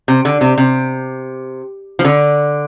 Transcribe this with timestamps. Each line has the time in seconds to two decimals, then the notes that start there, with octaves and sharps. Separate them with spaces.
0.08 C3
0.25 D3
0.41 C3
0.58 C3
1.99 F3
2.05 D3